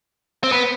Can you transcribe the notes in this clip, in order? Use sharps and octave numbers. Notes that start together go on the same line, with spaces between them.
C4
B3